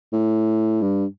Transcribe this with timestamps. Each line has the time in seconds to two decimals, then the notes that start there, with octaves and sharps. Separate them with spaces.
0.13 A2
0.81 G2